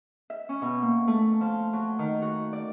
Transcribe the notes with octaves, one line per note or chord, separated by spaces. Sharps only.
E5
C#4
B2
A#3
A3
F3
F#3
D#3
F#4
D5